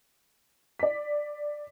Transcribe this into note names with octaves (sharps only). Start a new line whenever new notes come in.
D5 B6